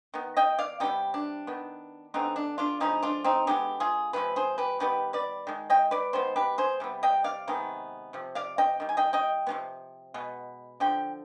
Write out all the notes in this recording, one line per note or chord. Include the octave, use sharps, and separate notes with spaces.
D#3 B3
D#5 G5
D5 F5
C3 G3 B3 D#4 G4
D4
D#3 B3
D3 G#3 B3 C4 D#4
D4
D4 F4
D3 F3 G#3 B3 C4 D#4
D4 F4
C4 D#4
D3 G#3 B3 D#4 G4
F4 G#4
C3 F3 G#3 B4
G#4 C5
G4 B4
D#3 G3 B3 G4 B4
B4 D5
D#3 G#3
D#5 G5
B4 D5
D#3 G#3 B3 C5
G4 B4
G#4 C5
C3 G3 B3
D#5 G5
D5 F5
C3 D#3 G#3 B3
C3 F3
D5 F5
D#5 G5
D#3 G3
G#5
D#5 G5
D#5 G5
C3 F3 G#3 B3
B2 G#3 B3
D3 F3 G5